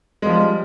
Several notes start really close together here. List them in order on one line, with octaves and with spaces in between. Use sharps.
G#3 F3 G3